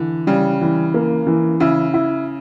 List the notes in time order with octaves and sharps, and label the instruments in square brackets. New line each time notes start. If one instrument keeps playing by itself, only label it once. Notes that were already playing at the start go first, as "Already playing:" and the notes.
Already playing: [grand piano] D3 [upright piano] E3
[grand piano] C#3 [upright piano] G3
[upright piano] E3
A#3
E3
[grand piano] C#3 [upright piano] E4
[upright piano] E4